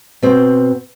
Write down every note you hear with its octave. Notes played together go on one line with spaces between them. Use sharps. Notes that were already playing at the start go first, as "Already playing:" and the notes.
B2 C4 C5